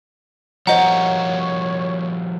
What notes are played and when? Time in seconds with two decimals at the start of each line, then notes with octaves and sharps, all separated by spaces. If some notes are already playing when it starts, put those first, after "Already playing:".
0.67 F3 G3 A#4 C5 C#5 D#5 F#5 A#5